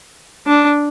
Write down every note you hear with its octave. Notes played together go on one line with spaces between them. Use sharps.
D4